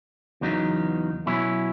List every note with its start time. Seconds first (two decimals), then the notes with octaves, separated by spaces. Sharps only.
0.41 E2 C#3 F#3 B3 D#4
1.26 B2 F#3 C#4 E4